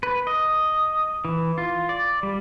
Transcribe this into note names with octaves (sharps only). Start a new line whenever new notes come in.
B4
D#5
E3
F4
D5
G3